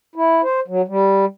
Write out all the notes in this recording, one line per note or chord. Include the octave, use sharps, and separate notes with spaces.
E4
C5
F#3
G3